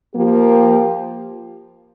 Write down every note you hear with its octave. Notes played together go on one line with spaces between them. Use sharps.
F3 A#3 G4